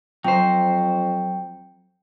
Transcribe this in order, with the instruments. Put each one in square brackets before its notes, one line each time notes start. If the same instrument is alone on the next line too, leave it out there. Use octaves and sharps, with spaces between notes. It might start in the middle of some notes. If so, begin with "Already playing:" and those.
[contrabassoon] F2 [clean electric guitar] F#3 C5 [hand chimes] G5